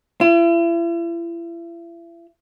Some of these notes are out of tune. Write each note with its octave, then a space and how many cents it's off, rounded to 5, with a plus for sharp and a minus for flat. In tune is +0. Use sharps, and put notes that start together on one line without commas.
E4 +40